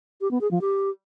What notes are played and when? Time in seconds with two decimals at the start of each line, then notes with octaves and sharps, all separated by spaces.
0.21 G4
0.31 B3
0.41 G#4
0.51 F3
0.61 G4